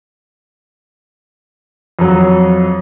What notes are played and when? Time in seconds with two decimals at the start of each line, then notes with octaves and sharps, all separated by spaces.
1.99 F2 F#3